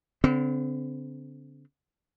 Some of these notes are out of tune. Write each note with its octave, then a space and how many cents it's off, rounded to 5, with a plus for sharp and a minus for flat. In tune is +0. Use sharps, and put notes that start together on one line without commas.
D3 -40 C4 -30